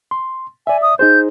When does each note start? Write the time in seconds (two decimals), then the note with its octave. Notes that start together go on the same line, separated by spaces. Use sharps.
0.11 C6
0.67 D5 E5 G#5
0.82 D#6
0.99 D#4 G#4 C5 G6